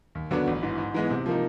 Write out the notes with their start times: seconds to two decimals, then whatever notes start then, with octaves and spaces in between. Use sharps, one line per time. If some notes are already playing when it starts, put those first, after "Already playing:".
0.15 D#2
0.31 D3 F#3 B3 D4
0.47 A1
0.63 G#2 E3
0.78 G#2
0.94 E3 G#3 B3
1.10 C3
1.26 F3 A#3 D#4